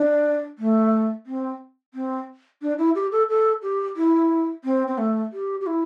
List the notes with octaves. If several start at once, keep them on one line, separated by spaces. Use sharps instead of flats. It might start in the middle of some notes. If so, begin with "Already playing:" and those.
Already playing: D4
A3
C4
C4
D4
E4
G4
A4
A4
G4
E4
C4
C4
A3
G4
G4
E4